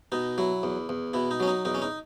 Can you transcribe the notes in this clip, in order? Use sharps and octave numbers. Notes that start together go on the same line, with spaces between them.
B2 D#4
F#3 E4
E2
E2
B2 E4
D#4
F#3 C#4
D#4
E2 D#4
C#4
D#4